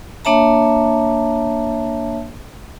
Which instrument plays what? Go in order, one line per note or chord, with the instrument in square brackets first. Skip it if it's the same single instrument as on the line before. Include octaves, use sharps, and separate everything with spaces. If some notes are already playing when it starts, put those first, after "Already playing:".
[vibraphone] A#3 D4 C#5 E5 A5 A#5